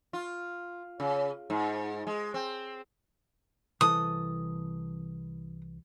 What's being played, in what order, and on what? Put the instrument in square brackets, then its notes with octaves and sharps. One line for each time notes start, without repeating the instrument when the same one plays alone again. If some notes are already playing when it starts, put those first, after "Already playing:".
[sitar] F4
C#3
G#2
G#3
C4
[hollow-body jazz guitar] C2 E3 A4 [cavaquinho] D#6